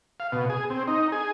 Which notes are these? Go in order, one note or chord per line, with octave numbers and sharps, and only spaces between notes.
F5
B2
G#4
C4
D#4
G#4